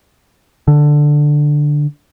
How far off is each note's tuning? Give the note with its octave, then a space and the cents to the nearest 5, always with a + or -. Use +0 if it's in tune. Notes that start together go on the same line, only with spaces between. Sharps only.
D3 +5